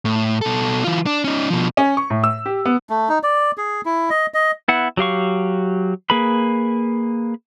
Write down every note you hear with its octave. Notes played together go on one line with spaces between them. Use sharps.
A2
B2 A4
E3 F4
D4
C#4 D#4
B2 F3
C#4
C#6
A2
E6
G4
B3
A3
D#4
D5
G#4
E4
D#5
D#5
B3 E4 F#5
F#3 G4 F5 C#6
A#3 G#4 B4 B5